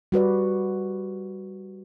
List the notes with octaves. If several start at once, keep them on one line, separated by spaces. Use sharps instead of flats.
G3 F#4 B4 D5